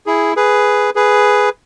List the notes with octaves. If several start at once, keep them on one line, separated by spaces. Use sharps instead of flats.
E4 G#4
G#4 B4
G#4 B4